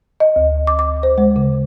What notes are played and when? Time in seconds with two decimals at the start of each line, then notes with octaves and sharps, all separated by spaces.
0.20 D#5
0.36 D2
0.67 D6
0.79 D6
1.03 C5
1.18 G#3
1.36 C#3